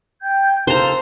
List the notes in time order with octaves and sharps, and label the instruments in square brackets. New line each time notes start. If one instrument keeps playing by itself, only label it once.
[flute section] G5 G6 G#6
[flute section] A4 F5 [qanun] C5 A#5